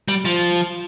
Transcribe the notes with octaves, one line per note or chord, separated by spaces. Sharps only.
G3
F3